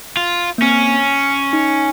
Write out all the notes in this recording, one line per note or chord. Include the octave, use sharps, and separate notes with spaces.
F4
A#3
C4 C#4
D#4